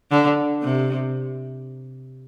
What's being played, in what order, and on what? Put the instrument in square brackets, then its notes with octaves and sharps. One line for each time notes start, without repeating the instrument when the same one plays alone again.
[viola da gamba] D3
C3